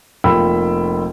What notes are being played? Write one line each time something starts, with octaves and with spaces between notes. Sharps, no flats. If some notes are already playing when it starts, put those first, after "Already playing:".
F1 A#3 F4 G5 B5 E6